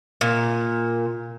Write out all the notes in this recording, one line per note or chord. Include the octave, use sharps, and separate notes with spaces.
A#2